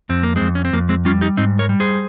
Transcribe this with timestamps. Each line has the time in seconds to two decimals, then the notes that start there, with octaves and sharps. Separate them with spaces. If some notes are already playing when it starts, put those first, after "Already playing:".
0.09 F2 C4
0.23 A#3
0.36 F2 G#3 C4
0.55 C#4
0.65 C4
0.73 F2 A#3
0.89 G#3 C4
1.05 G3 C#4 F4
1.21 D#4 G4
1.37 G#2 C4 D#4
1.59 A#4 C#5
1.69 G3
1.80 G#4 C5